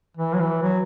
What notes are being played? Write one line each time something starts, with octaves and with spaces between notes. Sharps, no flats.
E3
F#3
E3
F#3